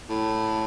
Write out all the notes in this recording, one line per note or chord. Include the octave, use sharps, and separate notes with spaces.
A2